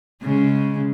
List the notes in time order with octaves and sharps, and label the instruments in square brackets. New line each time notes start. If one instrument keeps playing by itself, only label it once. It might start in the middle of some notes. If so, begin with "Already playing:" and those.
[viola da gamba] C#3 G#3